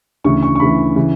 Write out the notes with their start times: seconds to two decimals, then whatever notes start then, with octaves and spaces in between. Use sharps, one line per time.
0.24 D2 C#3 E3 C#6
0.43 C#6
0.55 C#6
0.60 D2 C#3 E3 B5
0.96 C#3 E3